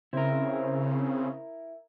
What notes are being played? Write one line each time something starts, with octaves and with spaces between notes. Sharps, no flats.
C#3 C4 E4 A#4